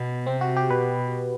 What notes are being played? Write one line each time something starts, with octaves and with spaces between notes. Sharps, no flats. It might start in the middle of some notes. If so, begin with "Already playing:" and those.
Already playing: B2 B3
C3 C4
F#4
G4
B2 B4